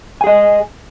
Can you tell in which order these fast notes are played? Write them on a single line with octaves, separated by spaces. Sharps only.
G#5 G#4 D#5